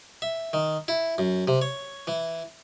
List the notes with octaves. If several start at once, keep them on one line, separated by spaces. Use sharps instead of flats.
E5
D#3
E4
F#2
C3
C#5
E3